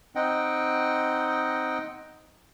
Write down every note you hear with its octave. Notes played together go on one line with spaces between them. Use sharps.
C4 D#4 D#5 F#5 G5